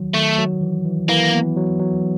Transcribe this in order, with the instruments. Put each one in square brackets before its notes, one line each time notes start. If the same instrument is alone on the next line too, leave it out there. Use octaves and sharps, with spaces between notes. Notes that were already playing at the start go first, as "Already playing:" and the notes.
Already playing: [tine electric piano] D#3 F#3
[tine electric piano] D#3 [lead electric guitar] A3
[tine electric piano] F#3
E3
E3
[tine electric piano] E3 [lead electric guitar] A#3
[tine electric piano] B3
F#3
F#3